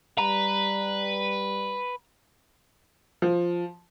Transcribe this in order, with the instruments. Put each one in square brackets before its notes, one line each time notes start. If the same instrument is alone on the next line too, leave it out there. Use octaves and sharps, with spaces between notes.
[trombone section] G3 [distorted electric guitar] B4 [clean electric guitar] A#5
[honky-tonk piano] F3